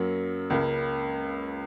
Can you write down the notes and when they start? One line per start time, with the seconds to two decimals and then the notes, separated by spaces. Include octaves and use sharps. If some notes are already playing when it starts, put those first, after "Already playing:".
Already playing: F#2 F#3 A#3
0.50 C#2 C#3 A#3